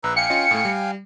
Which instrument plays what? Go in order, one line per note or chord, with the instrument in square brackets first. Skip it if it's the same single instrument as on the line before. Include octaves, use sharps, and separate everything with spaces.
[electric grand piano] A#1 [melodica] B4 A#5 E6
[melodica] F5 G5 G#5 [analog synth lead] C#7
[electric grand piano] C#4 F4 D#5
A2 A3
G3